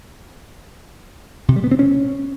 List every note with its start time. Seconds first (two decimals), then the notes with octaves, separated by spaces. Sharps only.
1.48 C3
1.56 G3
1.64 B3
1.71 C4
1.79 C#4